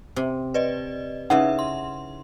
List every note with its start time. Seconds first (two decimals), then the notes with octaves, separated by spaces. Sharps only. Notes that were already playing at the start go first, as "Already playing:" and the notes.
0.16 C3
0.54 B4 D5 D#5
1.30 C#3 D#4 E4 B4 E5 F#5
1.59 C6